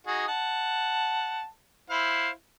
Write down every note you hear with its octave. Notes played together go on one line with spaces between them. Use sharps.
D#4 F#4 G#4
F#5 A5
E4 C5 F5